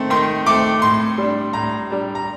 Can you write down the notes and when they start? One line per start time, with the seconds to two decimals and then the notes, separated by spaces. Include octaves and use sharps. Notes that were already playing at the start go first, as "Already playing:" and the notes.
Already playing: D#3 A3 C4
0.10 D#3 C6
0.46 A3 C4 D6
0.82 A2 C6
1.18 G3 D4
1.53 A2 A#5
1.90 G3 D4
2.15 A#5